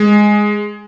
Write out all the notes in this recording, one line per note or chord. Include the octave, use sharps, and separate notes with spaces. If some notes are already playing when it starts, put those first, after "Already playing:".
Already playing: G#3